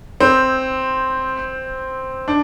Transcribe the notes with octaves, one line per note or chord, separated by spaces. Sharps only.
C4
D4